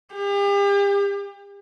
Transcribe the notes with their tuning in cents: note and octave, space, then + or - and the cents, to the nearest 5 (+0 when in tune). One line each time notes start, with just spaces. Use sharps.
G4 +40